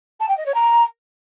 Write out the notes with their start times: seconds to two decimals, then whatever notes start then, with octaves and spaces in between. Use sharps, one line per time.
0.20 A5
0.28 G5
0.37 D#5
0.46 C#5
0.54 A#5